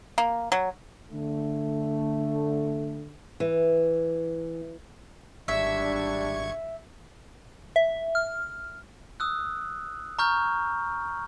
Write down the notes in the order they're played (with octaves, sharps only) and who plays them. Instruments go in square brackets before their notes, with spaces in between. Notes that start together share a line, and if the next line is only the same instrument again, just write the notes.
[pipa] A#3
F#3
[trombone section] D3 A3
[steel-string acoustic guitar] E3
[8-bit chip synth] G#1 C#6 G#6 [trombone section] G3 D4 [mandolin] E5
[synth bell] E5
F6
[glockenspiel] D#6 E6 F#6
A#5 C#6 F6 G6